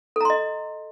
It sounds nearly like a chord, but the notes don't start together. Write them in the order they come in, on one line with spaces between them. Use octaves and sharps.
A4 A#5 C6 D#5